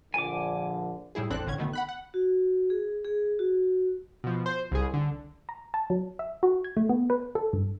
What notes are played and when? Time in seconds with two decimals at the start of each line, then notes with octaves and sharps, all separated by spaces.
0.14 A#1 D3 G#5 D6
1.15 A2 G3 E4 G#4
1.30 G#1 E2 C4 D4 A4 F#6
1.46 A1 A2 D3 C#4 G#6
1.58 B2 D3 D#3 A3 B3
1.73 F#5 B5 F#6
1.89 F#5
2.14 F#4
2.70 G#4
3.04 G#4
3.39 F#4
4.24 B2 F3
4.46 C5
4.72 C2 G#4
4.93 D3
5.49 A#5
5.74 A5
5.90 F#3
6.19 E5
6.43 F#4
6.64 G#6
6.77 A3
6.89 B3
7.10 B4
7.35 A4
7.53 G2